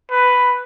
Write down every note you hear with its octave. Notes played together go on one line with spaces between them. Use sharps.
B4